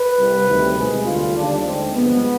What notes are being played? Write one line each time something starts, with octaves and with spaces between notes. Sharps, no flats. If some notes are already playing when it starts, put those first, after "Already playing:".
Already playing: B4
C2 C3 G3
D2 C3 D#3 G3
C2 B2 G#3 G#4
D2 D3 G3 F4
D#2 D3 G3 D4
D#2 D3 G#3 C4
G2 F3 G#3 B3